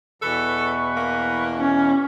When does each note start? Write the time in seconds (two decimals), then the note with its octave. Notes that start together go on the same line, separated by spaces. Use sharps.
0.22 E2 B2 E3 A4 B4 C#6
0.96 A#3
1.58 C#4